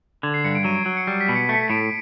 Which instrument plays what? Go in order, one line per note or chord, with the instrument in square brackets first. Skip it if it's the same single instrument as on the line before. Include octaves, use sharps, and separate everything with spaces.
[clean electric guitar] D3 [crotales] G#6
[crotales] C7
[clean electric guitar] G2 [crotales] C#7
[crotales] D7
[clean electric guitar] F#3 [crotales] D#7
[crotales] D7
[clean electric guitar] F#3 [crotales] D7
[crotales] C#7
[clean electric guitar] G3
[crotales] B6
[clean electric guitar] B2
[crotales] C#7
[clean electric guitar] A3 [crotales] C#7
[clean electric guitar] A2 [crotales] D7